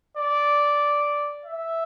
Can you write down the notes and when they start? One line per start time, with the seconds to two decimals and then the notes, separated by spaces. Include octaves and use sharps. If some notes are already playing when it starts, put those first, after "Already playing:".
0.17 D5
1.46 E5